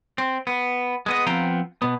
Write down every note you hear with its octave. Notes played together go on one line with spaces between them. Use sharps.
C4
B3
G#3 B3 D#5
F3 B3 C4 F5 G5 A#5
B2 B3